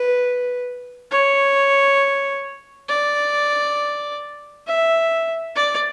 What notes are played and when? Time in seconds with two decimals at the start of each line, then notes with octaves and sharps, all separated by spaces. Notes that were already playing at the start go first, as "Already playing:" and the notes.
Already playing: B4
1.11 C#5
2.89 D5
4.67 E5
5.56 D5